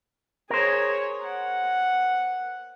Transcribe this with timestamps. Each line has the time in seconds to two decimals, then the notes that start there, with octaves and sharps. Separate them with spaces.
0.50 G#4 A#4 C5 C#5
1.23 F#5